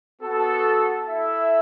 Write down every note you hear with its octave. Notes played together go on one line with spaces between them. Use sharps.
B3 F#4 A4
E4 A4 E5